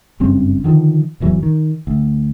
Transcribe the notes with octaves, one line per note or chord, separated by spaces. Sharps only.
F#1 G2 C4 C#4
D3 D#3 F3
D1 E2 E3 F#3
D#3
D2